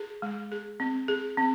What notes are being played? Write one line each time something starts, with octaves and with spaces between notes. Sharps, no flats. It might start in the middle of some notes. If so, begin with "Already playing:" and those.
Already playing: G#4
G#3
G#4
C4
G#4
C4